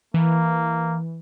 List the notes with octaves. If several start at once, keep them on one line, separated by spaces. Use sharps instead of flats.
E3 A#3